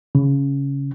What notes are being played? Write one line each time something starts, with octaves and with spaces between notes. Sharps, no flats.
C#3